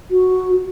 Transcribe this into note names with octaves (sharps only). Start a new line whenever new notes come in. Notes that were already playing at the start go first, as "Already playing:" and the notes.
F#4